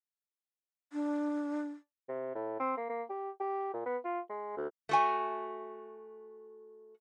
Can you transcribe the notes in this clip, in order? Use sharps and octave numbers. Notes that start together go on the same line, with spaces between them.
D4
C3
A2
C4
A#3
A#3
G4
G4
A#2
B3
F4
G#3
D2
A3 F#4 G#5